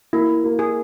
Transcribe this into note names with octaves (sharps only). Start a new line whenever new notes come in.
A#3 E4
A#3
G#4